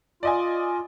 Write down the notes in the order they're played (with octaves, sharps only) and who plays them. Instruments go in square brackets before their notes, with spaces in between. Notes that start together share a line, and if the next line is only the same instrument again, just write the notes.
[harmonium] F4 [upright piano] D5 D#5 G#5